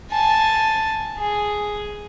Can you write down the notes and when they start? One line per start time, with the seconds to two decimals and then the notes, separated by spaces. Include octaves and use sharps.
0.12 G#5 A5
1.18 G#4